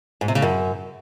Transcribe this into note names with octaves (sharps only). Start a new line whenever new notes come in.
G#2
C3
C#3
F#2